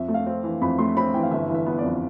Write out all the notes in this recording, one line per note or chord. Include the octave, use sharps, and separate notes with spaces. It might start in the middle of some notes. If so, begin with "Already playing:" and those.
Already playing: F2 E5
A3
F5
C4
E3
F2 B5
A3 C6
C4 B5
E3 G5
F5
G1 E5
E3
E5
B3
D5
F2